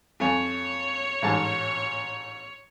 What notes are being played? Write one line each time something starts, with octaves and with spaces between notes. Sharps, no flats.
F2 C#5 G#5
A1 G#2 A5